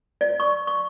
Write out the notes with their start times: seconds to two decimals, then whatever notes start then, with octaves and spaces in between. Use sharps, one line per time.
0.21 D5
0.40 C#6
0.67 C#6